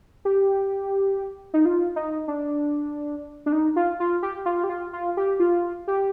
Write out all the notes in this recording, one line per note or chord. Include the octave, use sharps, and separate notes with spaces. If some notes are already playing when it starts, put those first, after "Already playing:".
G4
D#4
F4
D#4
D4
D4
D#4
F4
F4
G4
F4
G4
F4
F4
G4
F4
G4